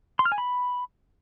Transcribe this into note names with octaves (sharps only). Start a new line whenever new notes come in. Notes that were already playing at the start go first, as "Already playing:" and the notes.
C6
F6
G#5
B5